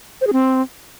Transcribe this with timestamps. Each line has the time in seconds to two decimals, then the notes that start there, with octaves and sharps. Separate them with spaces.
0.21 C5
0.27 G#4
0.33 C4